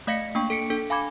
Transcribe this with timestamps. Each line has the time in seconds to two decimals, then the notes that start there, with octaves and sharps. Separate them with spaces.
0.07 A3 D#5 F5 A#6 B6 C#7
0.35 A#3 D4 G5 C#6
0.50 A4 B6 C#7 D7
0.70 D4 A4
0.90 F5 G#5 B5 D6 G#6